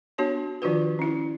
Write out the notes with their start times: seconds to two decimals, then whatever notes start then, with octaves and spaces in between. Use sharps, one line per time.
0.18 B3 D4 F#4 C#5 A5
0.62 D#3 F3 D4 F4 F#4 B4
0.99 C#4 E4